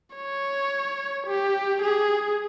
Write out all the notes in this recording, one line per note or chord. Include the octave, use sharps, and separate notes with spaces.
C#5
G4
G#4